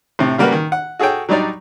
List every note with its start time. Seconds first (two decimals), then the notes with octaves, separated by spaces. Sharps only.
0.19 A2 C3
0.38 C#3 G3 A#3 F#4 A#4 B4
0.52 D#3
0.72 F#5
0.99 F#4 G#4 A4 C#5 G5
1.29 F#3 G3 D4 D#4 D5